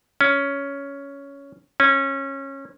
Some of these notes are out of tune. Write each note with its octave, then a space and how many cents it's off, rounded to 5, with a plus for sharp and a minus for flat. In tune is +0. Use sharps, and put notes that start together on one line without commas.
C#4 +10
C#4 -20